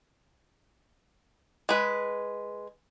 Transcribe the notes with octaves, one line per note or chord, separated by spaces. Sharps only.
G#3 B4